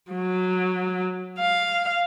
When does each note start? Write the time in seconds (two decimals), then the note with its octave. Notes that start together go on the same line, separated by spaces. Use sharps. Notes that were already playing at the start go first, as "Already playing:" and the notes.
0.12 F#3
1.39 F5